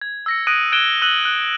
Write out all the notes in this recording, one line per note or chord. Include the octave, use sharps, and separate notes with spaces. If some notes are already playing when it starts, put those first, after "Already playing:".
G#6
E6 A#6 C#7
D#6 F#6 G#6 A#6 D7 D#7
F#6 G#6 D7 E7 G7
E6 F#6 D#7 F#7 G7
F#6